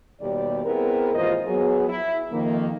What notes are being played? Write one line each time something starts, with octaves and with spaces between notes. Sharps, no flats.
D#2 B2 G3 G4 D5
B3 C4 E4 G#4 A#4
D#2 G#2 E3 F4 C5 D#5
F#3 B3 G#4
E4
F2 D#3 A#3